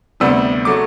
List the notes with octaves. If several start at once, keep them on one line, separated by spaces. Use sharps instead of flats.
D2 C3 G3 B3 E6
F#3 A3 D6